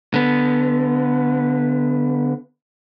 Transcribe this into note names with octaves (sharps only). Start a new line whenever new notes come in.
D3 B3